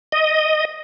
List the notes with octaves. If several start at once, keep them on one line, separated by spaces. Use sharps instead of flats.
D#5